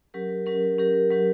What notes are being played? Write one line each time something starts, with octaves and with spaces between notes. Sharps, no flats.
F#3 C#4 G4 A#4
F#3 C#4 G4 A#4
F#3 C#4 G4 A#4
F#3 C#4 G4 A#4